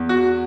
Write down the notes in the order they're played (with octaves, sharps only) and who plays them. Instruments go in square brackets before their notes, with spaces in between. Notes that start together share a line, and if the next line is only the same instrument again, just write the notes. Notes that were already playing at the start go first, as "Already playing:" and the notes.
Already playing: [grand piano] E2
F#4